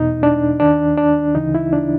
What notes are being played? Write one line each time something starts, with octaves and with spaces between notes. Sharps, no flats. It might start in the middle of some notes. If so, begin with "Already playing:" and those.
Already playing: E2 B2 D#4
D4
D#2 D#3 D4
D4
D2 C#3 E3 D#4
E4
D4